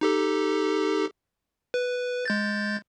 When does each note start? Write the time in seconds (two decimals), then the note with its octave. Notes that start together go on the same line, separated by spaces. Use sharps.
0.01 D#4 G4 A4
1.74 B4
2.25 G#3 G6 A6